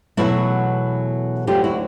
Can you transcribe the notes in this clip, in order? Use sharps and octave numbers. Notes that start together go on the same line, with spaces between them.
E2 B2 F#3 A3 E4 F#4
D2 D3 F#3 F4 G4
E4 F#4